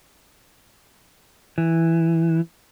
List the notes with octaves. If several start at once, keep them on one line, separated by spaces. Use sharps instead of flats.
E3